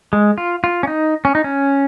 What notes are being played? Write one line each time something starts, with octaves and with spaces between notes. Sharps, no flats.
G#3
F4
F4
C#4
D#4
C#4
D#4
C#4